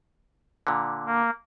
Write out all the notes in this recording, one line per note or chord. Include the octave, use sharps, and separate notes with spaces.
A#2 D3
A#3